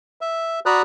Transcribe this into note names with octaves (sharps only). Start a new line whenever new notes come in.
E5
F#4 D5 A#5 B5 D#6 F#6